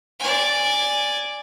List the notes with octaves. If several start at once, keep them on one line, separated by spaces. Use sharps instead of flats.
D5 G#5